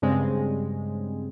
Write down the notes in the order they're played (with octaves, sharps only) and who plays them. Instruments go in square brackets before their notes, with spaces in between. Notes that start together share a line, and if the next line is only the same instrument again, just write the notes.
[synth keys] G2 C#3 G#3 C4